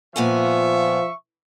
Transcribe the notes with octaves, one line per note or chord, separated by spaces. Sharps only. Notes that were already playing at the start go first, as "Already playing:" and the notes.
A#2 F3 B3 E5 G#5 C#6